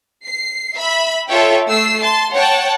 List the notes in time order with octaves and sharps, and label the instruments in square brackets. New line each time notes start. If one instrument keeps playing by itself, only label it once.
[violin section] C7
E5 B5
F4 A4 C#5 E5 G5
A3 E6 C7
A5 C6
C#5 F#5 G5 A5